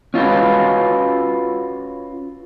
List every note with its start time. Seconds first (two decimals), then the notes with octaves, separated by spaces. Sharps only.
0.14 C#4 F4 F#4 B4